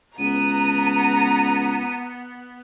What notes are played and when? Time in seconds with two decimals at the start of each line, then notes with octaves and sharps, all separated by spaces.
0.18 C#2 B3 A#5 D#7